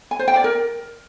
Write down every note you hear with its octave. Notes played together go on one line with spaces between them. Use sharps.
G#5
C5
G5
D5
A#4